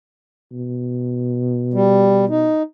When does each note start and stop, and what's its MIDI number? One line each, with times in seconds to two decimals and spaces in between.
0.52 2.50 47
1.74 2.25 55
2.29 2.62 63